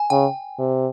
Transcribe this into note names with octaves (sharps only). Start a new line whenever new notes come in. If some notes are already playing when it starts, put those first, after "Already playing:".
Already playing: G#5
C#3 G5
C3